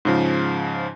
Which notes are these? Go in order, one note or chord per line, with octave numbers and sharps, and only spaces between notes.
G#2 C#3 F3